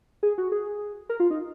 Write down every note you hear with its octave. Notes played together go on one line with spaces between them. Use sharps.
G#4
F#4
G#4
A#4
F4
D#4